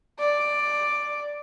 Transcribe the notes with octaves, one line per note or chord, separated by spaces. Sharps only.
D5